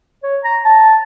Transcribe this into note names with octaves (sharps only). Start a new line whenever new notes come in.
C#5
A#5
A5